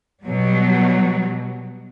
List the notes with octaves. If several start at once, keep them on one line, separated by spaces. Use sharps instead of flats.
B2 F#3 G3